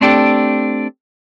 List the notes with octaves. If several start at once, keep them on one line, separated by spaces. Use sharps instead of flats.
A3 C4 D4 G4 A4